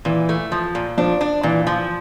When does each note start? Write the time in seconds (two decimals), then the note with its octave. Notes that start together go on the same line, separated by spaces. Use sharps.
0.05 A#2 E3
0.29 A3
0.52 F3
0.75 A#2
0.98 F3 D4
1.21 D4
1.43 A#2 E3
1.67 F3